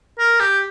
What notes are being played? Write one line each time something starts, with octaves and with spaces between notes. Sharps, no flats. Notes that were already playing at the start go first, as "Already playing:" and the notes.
A#4
G4